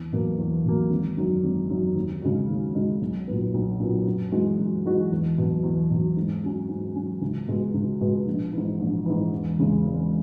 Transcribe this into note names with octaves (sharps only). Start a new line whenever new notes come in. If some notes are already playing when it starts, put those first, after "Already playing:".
Already playing: E2
B2 F#3 A#3
E2
B2 F#3 A#3
G#1
F#2 D#3 F#3
G#1
F#2 D#3 F#3
D#2
C#3 G#3 D#4 F#4
D#2
C#3 G#3 D#4 F#4
B1
A#2 F#3 B3
B1
A#2 F#3 B3
F#2
E3 G#3 D#4 F#4
F#2
E3 G#3 D#4 F#4
E2
B2 F#3
E2
B2 F#3
G#2
F#3 C#4 F#4
G#2
F#3 C#4 F#4
C#2
B2 G#3 B3 F#4
C#2
B2 G#3 B3 F#4
A#1
G#2 E3
A#1
G#2 E3
E1
E2 C#3 G#3
E1